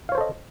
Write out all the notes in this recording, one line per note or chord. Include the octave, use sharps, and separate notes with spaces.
A4 C5 C#5 D#5 F5